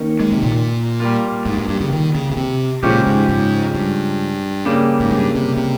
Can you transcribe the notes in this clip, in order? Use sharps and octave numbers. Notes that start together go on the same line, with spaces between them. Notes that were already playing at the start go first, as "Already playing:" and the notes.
Already playing: D#3 A#3 C#4
G#3
C3
A#2
G3 A#3 F4
G#2
G2
G2
C#3
D#3
C#3
C#3
C3
A#2 C#3 F3 G#3 C#4 G4
G#2
G#2
G2
C#3 G3 A#3
G#2
G2
C3
C3